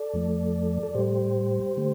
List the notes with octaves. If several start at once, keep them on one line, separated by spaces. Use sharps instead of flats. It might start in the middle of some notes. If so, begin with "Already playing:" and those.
Already playing: A4 D5
F2 F3 A3
A4
A2 G3 G4 C5
D3 A3